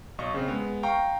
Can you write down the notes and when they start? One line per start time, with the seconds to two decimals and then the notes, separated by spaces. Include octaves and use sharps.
0.19 B1 D#5 C#6
0.34 C#3 C4
0.48 G#3 B3
0.83 F5 G5 A#5 C#6